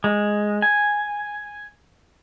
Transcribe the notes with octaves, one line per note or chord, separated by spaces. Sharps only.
G#3
G#5